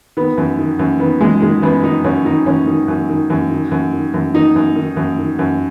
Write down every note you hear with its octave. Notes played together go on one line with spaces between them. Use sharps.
D#3 B3
F#2
D#3
F#2
D#3 B3
F#2 G#3
D#3 G#3
F#2 B3
D#3 D#4
F#2 C#4
D#3 D#4
F#2 C#4
D#3
F#2
D#3
F#2
D#3
F#2
D#3
F#2
D#3 D#4
F#2
D#3
F#2
D#3
F#2